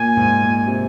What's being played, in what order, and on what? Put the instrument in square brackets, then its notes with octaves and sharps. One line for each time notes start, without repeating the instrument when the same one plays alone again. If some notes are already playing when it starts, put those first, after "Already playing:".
Already playing: [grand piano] A#2 [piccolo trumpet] G#5
[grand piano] G#2
A#2
C3